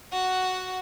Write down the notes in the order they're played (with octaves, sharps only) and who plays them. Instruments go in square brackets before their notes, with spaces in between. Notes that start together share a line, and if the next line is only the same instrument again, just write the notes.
[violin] F#4 F#5